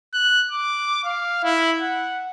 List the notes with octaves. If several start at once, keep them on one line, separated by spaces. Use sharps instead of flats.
F#6
D6
F5
E4
F#5